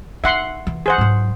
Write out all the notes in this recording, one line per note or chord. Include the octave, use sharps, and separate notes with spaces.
D#4 E5 F#5 C6
E3
G#4 C5 F#5
G#2 F#3